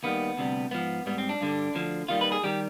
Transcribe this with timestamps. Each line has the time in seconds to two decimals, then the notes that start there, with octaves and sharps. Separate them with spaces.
0.03 D#2 D#3 G3 B3
0.38 D2 C3 G3
0.71 G#2 F3 B3
1.06 G#2 G3 B3
1.18 C4
1.29 D4
1.41 G2 D3 G3
1.75 D2 D3 F3
2.08 D#2 D#3 G3 F4
2.21 B4
2.32 G#4
2.44 D#3 G3 G4